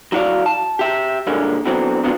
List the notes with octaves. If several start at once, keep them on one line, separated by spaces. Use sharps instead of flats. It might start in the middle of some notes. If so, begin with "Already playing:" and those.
F#3 E4 F#4 D5 F5
A5
G4 E5
A#2 D3 G3 G#3 A#3 C#4
B2 D3 E3 F#3 C4
C3 F#3 B3 D4 F4